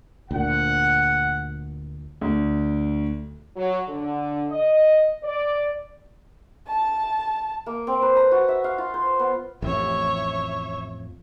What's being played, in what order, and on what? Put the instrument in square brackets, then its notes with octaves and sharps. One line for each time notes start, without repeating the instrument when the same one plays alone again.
[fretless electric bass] D2 A#2 [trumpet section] F#5
[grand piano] D2
[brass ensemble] F#3
D3
D#5
D5
[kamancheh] A5
[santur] A#3
C4
B4
A#5
F#4
E5
F5
F4
C5
B3
[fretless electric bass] A1 F2 [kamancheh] C#5 E5